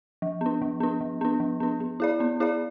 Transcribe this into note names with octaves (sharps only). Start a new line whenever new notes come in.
F3
B3 D4
F3
B3 D4
F3
B3 D4
F3
B3 D4
B3
E4 G#4 D5
B3
E4 G#4 D5